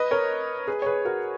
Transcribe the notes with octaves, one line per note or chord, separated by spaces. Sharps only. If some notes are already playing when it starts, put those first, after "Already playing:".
Already playing: B4 D#5
A#4 C#5
G#4 B4
C#5
G#4 B4
F#4 A#4